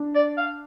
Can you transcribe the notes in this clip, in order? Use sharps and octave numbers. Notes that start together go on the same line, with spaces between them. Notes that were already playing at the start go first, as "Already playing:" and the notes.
Already playing: D4
D5
F5